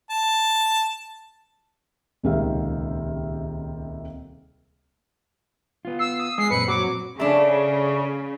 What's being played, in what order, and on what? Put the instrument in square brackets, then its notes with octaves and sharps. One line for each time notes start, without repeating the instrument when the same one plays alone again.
[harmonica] A5
[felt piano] D#1 C#2 C3 D#3 E5 F5
[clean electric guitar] B3 F4
[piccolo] E6 [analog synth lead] C7
[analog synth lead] D#6
[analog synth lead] G#3 [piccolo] C7
[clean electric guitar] F#2 A#2 C4 [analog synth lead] B4 [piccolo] C#7
[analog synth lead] F#3 [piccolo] D6
[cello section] C#3 [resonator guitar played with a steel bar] A3 D4